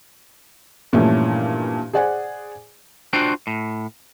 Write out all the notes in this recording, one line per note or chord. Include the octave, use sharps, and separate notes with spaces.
G2 A#2 E3 F3 A3 C#4
G#4 C5 D5 F#5 G#5
D4 F4 F#4 C5 G5
A2